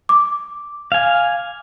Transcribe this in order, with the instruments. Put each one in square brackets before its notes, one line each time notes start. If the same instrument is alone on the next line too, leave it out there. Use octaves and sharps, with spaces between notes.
[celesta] D6
[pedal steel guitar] F5 G#5